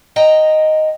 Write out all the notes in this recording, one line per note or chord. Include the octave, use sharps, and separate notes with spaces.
D#5 G5 A#5